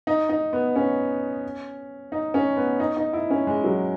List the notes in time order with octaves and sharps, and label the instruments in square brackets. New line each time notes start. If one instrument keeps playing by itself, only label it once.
[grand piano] D#4
D#4
B3
C#4
D#4
C#4
B3
D#4
D#4
E4
C#4
G#3
F#3